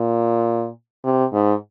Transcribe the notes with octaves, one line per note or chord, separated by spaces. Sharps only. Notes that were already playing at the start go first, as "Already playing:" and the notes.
Already playing: A#2
C3
G#2